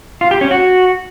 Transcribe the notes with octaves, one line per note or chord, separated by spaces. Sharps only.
F4
G4
C#4
F#4